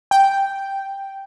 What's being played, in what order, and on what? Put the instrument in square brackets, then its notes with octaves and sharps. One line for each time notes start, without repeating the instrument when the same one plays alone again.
[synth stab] G5